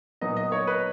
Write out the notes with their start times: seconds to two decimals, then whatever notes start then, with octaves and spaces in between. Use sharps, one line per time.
0.21 A#2 F#3 B3 D#4 D#5
0.37 D#5
0.52 C#5
0.67 B4